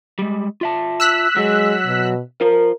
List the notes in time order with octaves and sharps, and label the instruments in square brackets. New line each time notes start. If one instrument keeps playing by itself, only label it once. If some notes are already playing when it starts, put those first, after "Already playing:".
[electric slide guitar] G3 G#3
F4 E5 A5
[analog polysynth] E6 F#6 B6
[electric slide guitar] F#3 [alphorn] G#3
[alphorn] B2
[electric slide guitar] F4 C5 [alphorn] A#4